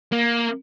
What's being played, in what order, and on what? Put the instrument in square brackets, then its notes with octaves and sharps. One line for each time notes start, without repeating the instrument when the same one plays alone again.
[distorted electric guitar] A#3